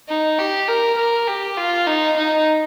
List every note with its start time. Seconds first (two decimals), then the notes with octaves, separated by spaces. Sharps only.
0.09 D#4
0.39 G4
0.68 A#4
0.98 A#4
1.27 G4
1.57 F4
1.87 D#4
2.17 D#4